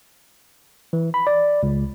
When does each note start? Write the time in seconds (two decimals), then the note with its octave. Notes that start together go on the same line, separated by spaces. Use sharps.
0.93 E3
1.14 B5
1.27 D5
1.63 C#2